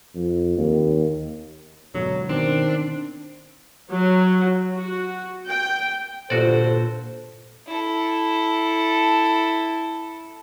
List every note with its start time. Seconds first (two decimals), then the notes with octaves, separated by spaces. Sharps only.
0.15 F2
0.58 D#2
1.95 G#2 B2 D3 F#3
2.29 B2 D#3 C4 D4
3.92 F#3
4.72 F#4
5.48 G5
6.30 G1 A#2 F#4 A4 C5 D5
7.67 E4 A4